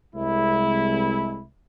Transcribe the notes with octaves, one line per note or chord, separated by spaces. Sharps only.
C2 G#3 E4